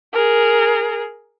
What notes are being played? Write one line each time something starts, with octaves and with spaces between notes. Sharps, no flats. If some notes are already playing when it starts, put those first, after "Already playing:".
G#4 A#4